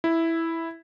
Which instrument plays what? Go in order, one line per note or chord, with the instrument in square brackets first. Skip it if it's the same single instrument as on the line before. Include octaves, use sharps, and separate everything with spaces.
[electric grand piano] E4